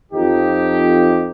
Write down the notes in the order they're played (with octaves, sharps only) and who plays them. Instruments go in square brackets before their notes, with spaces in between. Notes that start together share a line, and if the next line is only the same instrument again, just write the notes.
[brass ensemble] F2 D#4 G4